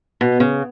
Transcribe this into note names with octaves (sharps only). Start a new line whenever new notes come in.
B2
C#3